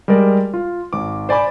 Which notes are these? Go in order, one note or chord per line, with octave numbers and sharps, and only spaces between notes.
G3 G#3 A#4 D5
F4
G#1 D6
C5 D5 G#5 B5 D6